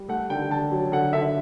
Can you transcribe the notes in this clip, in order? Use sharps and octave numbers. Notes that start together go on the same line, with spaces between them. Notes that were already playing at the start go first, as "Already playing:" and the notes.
Already playing: G3
A3 F#5
D3 G5
D3 A5
F#3
D3 F#5
D3 E5